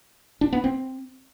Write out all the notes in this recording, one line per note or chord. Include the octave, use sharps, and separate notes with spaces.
D4
B3
C4